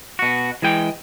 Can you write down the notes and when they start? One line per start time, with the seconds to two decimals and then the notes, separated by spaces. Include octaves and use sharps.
0.19 B2 F#4
0.62 E3 G#3 G5